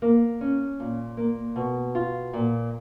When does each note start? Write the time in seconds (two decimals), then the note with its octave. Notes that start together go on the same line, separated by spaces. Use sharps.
0.02 A#3
0.41 C#4
0.80 A#2
1.17 A#3
1.56 B2
1.95 F4
2.33 A#2